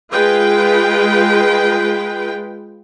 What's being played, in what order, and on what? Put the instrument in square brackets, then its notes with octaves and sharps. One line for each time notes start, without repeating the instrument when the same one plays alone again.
[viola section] G#3 F4 B4 G5